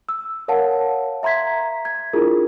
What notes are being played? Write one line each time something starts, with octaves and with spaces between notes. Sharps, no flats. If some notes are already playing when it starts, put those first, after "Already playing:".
E6
A#4 C#5 F5 F#5 A5
E5 A#5 C6 G#6 B6
G#6
D4 E4 F4 G#4 A#4